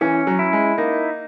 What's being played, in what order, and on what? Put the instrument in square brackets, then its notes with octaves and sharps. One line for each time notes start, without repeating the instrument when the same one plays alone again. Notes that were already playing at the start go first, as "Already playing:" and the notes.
[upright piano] E3 [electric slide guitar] C#4
[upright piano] F#3
[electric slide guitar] E4
[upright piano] G#3
[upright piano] A#3 [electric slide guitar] D#4